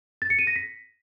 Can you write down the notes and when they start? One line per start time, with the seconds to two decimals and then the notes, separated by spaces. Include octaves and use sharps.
0.22 A6
0.30 C#7
0.39 D#7
0.47 A#6
0.56 B6